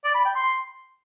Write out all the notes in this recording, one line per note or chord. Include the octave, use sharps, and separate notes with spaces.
D5
B5
G5
C6